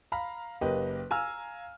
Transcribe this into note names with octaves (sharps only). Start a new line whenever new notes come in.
F5 A#5 B5
F#1 A#3 G4 B4 D#5
F5 G#5 A#5 E6 F6